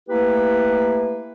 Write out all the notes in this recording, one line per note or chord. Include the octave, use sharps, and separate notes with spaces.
A3 A#3 E4 G4 B4